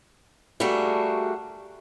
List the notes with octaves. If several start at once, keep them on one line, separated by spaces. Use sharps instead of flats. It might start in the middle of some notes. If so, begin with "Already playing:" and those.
G3 A3 A#3 D4 F#4 G#4